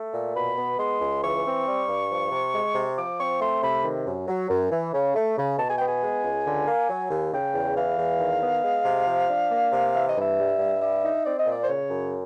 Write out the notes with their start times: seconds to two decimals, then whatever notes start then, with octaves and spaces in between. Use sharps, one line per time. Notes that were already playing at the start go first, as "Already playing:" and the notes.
Already playing: A3
0.14 A#2
0.35 B2 B5
0.58 B3
0.78 G#3 C6
1.01 C#2
1.22 E3 C#6
1.45 C4
1.66 G3
1.88 G2
2.10 F3
2.31 C3
2.53 G#3
2.75 C3
2.97 F3 D6
3.19 C4 C#6
3.40 A3 C6
3.62 C3 B5
3.84 D#3
4.06 F#2
4.28 F#3
4.49 F#2
4.71 E3
4.93 C#3
5.15 A3
5.37 C#3
5.58 B2 A5
5.68 G#5
5.77 B3 G5
5.87 G#5
6.02 G#3
6.24 C#2
6.46 D3
6.67 A#3
6.89 F#3
7.11 D#2
7.33 C#3 G5
7.54 E2
7.76 E3 F5
7.98 E2
8.20 D#3
8.41 B3
8.63 G#3
8.85 C3
9.07 F3
9.29 D4
9.51 A#3
9.72 C3
9.94 E3 E5
10.07 D#5
10.16 G2 E5
10.38 G3
10.59 G2
10.81 G3 E5
11.03 D#4
11.25 C4 D5
11.38 D#5
11.46 A#2 D5
11.61 C5
11.68 C#3 C#5
11.90 F#2